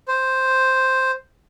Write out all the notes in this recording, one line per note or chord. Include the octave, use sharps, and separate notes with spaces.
C5